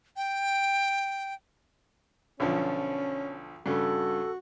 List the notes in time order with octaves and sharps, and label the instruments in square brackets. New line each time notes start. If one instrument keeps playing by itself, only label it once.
[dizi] G5
[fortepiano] B1 D3 F3 [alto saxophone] C#4
[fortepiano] G2 C#3 [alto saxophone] F#4 [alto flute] A4